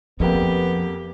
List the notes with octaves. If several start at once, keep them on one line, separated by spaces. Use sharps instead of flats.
F2 F3 A#3 B3 G4 G5